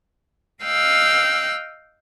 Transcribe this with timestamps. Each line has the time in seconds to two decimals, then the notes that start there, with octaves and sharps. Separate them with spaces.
0.63 D#5 F5 G5 E6 F#6